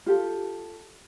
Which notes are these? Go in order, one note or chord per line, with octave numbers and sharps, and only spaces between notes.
F4 G4 A4